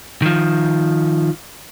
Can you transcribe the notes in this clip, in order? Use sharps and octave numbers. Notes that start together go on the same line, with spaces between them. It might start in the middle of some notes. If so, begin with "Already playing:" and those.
D#3 F3